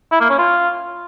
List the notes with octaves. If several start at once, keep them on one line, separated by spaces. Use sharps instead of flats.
E4
A#3
C#4
F4